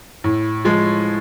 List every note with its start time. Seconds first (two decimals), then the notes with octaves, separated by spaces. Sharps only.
0.24 A2
0.65 F3 G#3